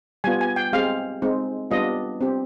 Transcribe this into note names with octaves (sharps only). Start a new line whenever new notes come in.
G3 B3 F4 G#5
G#5
G5
G#3 C4 G4 F5
G#3 C4 D#4
G3 B3 D4 F4 D#5
C4 G4